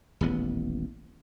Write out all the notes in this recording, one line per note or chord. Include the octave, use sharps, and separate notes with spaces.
D#1 A1 B3